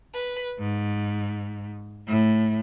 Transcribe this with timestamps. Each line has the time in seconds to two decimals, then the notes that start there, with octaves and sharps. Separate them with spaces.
0.14 B4
0.58 G#2
2.07 A2